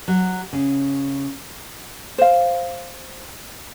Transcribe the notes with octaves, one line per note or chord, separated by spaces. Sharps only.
F#3
C#3
C5 F5